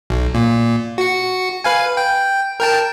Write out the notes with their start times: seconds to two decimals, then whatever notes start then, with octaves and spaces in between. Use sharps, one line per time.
0.10 B1
0.35 A#2
0.98 F#4 C#7
1.64 B4 F5 G#5
1.97 G5
2.60 A#4 G5 A5